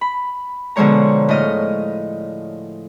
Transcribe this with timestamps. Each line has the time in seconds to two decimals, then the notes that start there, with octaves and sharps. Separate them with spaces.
0.01 B5
0.76 B2 D3 F3 G#3 C#5 A#5
1.28 A2 D#5 F6